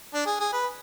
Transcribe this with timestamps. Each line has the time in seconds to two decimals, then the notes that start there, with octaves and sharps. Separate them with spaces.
0.14 D4
0.26 G#4
0.40 G#4
0.52 B4